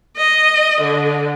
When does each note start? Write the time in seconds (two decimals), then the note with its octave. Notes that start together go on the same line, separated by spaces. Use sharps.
0.18 D#5
0.80 D3